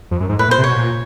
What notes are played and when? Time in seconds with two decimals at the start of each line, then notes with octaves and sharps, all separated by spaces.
0.11 F2
0.20 F#2
0.29 G#2
0.39 A2 B4
0.48 A#2
0.51 C5
0.58 C3
0.64 B2 C#5
0.76 A#2